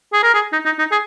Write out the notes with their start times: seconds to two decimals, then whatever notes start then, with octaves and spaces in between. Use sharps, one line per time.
0.13 G#4
0.23 A#4
0.34 G#4
0.53 D#4
0.65 D#4
0.79 D#4
0.92 G#4